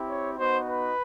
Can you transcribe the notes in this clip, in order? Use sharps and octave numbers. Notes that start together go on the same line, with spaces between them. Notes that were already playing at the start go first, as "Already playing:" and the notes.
Already playing: C4 E4 G4
C#5
B3 D#4 F#4 C5
B4